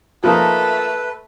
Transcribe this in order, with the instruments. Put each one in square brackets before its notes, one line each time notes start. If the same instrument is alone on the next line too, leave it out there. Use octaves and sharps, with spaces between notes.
[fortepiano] F3 A#3 D#4 [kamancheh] A3 [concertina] B4